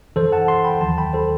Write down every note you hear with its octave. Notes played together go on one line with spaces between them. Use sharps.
F#2 E3 A4 C5
F#5 A5
A5 C6
G5 B5
D#2 D#3 F#3 A5 C6
G5 B5
A4 C5